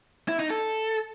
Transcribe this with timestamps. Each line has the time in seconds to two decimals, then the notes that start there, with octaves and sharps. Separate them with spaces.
0.29 E4
0.40 D#4
0.51 A4